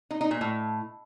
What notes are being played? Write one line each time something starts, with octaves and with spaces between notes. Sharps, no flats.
D#4
D#4
A#2
A2